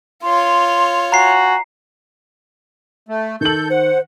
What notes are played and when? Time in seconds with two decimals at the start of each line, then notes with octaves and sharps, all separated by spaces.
0.23 F4 C#5 C6
1.12 F#4 G#5 A#5 C7
3.09 A3
3.41 D#3 A4 G6 F#7
3.70 C5 F#5